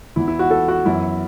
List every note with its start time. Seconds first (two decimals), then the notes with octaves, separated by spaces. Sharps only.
0.16 E2 E3 B3 E4
0.28 E4
0.39 F#4
0.51 A4
0.68 F#4
0.85 F#2 E3 B3 E4